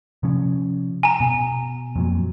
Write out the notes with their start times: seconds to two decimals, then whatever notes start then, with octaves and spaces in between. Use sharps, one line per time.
0.23 C3 F3 C#4
1.03 G#5 A#5
1.20 B2
1.96 F2 A#2 F#3